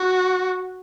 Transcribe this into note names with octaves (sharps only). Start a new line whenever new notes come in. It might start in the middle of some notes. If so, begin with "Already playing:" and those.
Already playing: F#4